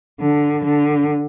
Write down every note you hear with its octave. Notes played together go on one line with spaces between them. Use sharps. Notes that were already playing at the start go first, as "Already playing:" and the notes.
D3
D3